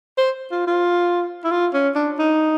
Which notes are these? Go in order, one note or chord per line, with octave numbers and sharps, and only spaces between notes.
C5
F4
F4
E4
F4
C#4
D4
D#4